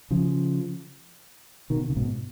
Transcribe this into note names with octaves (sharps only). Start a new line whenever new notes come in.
C#3 F3
B2 D#3
C#3
G#2 B2